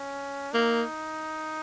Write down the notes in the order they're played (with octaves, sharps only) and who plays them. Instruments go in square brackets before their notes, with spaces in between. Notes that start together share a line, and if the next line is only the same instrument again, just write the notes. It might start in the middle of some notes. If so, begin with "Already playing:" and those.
Already playing: [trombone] C#4
[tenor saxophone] A#3 [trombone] D#4